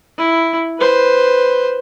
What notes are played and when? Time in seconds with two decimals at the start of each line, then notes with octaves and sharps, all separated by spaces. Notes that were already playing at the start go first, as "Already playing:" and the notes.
0.18 E4
0.79 B4 C5